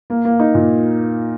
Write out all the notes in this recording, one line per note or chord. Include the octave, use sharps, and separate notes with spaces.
A#3
A#3
D#4
A#2